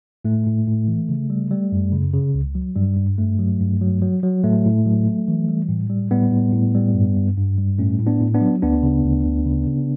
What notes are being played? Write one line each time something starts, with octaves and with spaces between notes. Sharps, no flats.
A2 A3
A2
A2
E3
C#3
G3
G3
F#2
C#3
C#3
C#2
F#3
G2 G3
G2
G2 A3
F#3
G2
F#3
F#3
F#3
A2 A3
A2
F#3
F#3
E3
G3
A2
G3
A2 G3 B3
A2
A2
G3
G2
G2
G2
G3
A2 A3 C#4
A2
B3 D4
A2
B3 D4
F#3
D2 B3 D4
C#3
D2
D2
C#3
C#3